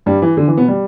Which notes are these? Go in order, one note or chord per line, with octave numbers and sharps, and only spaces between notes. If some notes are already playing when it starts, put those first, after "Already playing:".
G2 G3
E3
D3
E3
B2 B3
G3